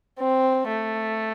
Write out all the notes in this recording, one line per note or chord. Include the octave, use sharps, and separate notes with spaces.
C4
A3